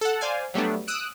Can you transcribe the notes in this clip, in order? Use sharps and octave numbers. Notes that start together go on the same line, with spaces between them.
A4 F#5
C5 D5 F5 G#5
F#3 G3 A3 B3 D4
D#6 E6 F#6 D7